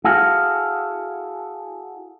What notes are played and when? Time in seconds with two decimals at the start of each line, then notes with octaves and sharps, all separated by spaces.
0.04 E4 F#4 G#4 A4 F5